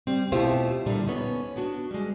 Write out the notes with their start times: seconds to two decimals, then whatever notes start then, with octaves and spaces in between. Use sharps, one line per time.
0.07 G3 C4
0.32 B2 A3 E4 F4 G4 C5
0.86 A#2 D3 G3
1.06 B3 C#4 D#4
1.56 B3 D4 F#4
1.91 G3 G#3